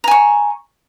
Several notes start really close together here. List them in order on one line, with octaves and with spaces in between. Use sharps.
A#5 G#5 C#6